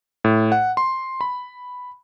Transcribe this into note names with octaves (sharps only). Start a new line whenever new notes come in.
A2
F#5
C6
B5